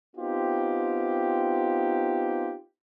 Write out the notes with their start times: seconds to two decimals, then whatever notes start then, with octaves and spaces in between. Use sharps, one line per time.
0.16 B3 C4 D#4 F4 G4